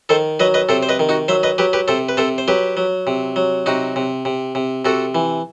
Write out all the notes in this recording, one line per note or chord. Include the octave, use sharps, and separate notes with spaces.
D#3 A4 C5
F#3 B4 D#5
B4 D#5
C3 A4 C5
C5
B4 D#5
D#3
D#4 F#4
F#3 C5 E5
B4 D#5
F#3 G4 B4
G4 B4
C3 A4 C5
B4
C3 A4 C5
C5
F#3 G4 B4
F#3
C3
F#3
C3 D#4 F#4
C3
C3
C3
C3 F#4 A4
E3